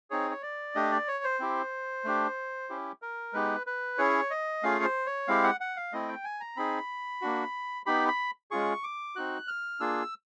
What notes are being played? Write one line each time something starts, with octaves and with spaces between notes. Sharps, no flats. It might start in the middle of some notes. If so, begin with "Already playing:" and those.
C4 D#4 G#4 C#5
C#5
D5
A3 D4 G4 D#5
D5
C#5
C5
C4 E4 G4
A3 D4 G4
C#4 E4 G4
A#4
G#3 B3 D#4 G4 B4
B4
C#4 E4 G#4 C#5
D#5
A3 C#4 F4 G#4 F5
C#5
C5
C#5
G#3 C4 E4 G4 F5
F#5
F#5
F5
A3 C4 E4 D#5
G5
G#5
A#5
C4 D#4 G#4 B5
A#3 D4 F#4
B3 D#4 G4 B5
B5
G#3 C#4 F4 G#4 C#6
D6
C4 D#4 F#4 F#6
F6
A#3 D4 F4 G#4 E6